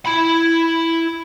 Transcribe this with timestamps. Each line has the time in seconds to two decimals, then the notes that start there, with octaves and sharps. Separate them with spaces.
0.06 E4 B5